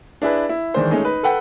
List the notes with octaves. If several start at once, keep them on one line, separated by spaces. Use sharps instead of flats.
D4 E4 G#4 B4
E4
D#3 E3 G#3 D4 C5
G#3 A3 C#4 D#4 G#4
D#4 B4
A4 B4 F#5 G5